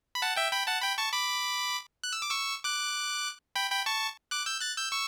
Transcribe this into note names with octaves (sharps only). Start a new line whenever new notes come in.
B5
F#5 A5
E5 G5
G5 B5
F#5 A5
G5 B5
A5 C#6
B5 D6
F#6
E6
D6
C#6 E6
D6 F#6
G5 B5
G5 B5
A5 C#6
D6 F#6
E6 G6
F#6 A6
E6 G6
C#6 E6